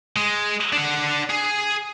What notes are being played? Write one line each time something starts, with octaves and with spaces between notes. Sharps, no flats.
G#3
D4 F#5
G#4